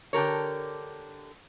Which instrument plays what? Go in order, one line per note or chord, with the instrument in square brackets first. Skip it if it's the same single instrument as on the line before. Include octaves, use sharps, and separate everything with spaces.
[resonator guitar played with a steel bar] D3 G4 A#4 C#5